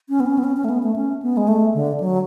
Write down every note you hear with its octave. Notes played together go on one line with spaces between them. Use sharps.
C#4
B3
C#4
B3
C#4
C#4
A3
B3
A3
C#4
B3
G#3
A3
D3
F#3